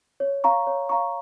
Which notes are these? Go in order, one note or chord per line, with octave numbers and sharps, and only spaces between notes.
C#5
F5 A#5 C#6
C#5
F5 A#5 C#6